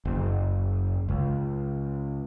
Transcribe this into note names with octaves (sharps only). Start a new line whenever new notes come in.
F#1
C#2